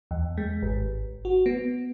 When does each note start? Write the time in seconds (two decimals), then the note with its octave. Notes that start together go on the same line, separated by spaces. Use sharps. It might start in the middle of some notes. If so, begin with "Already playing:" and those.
0.11 E2
0.38 G#3
0.62 G#1
1.25 F#4
1.46 B3